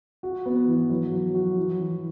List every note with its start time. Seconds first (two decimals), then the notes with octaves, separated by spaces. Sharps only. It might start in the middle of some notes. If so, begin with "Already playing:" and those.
0.23 F#4
0.46 B3
0.68 E3
0.90 F#3
1.12 F#3
1.35 F#4
1.57 E3
1.79 E3